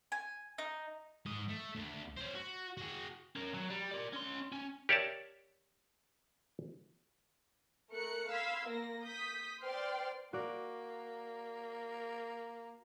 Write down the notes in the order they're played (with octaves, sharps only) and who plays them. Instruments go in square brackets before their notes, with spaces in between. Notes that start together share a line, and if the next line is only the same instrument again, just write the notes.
[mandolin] G#5
D#4
[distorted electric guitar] G#2 D#5
A3
D2
C#4 C5
F#4
F#4 G#4
[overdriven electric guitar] C#4 A#4
F#3
G3
A#4 D5
C#4 C6
C#4
[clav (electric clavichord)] G4 A#4 C#5 D5 E5 A5
[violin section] A3 A#4 F#6 C#7
F5 B5 C6 E6 G#6 B6
A#3 A#6
D#6 G6 B6
B4 C5 D5 G5 C6 F6
[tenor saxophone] A#3 [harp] F#4 D5